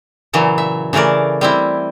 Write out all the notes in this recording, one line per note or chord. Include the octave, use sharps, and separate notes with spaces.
A#2 C#3 E3 F#3
E5
C#3 E3 A3 A#4 D5
G3 C4 E4